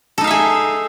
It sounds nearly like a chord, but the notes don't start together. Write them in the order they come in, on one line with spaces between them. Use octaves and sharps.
A4 D#4 F5 E5 G#4